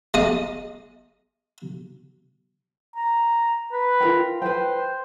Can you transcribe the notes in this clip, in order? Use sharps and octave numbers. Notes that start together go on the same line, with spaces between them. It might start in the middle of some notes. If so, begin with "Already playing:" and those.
G#3 D#5
A#5
B4
F4 A#4 G5
B4 C5 G5